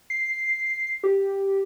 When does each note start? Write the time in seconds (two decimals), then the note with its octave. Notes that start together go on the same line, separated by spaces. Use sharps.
0.10 C7
1.03 G4